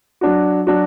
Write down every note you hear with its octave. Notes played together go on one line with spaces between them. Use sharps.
F#3 D4 F#4
F#3 D4 F#4